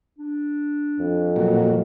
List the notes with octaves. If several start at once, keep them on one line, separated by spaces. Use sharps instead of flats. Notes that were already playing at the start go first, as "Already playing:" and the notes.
D4
F2
A#2 F#3